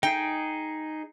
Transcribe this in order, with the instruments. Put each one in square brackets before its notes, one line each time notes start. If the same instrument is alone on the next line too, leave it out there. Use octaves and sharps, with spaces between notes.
[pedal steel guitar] D#4 G#4 [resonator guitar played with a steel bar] G5